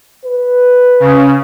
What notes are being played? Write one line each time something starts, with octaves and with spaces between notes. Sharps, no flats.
B4
C#3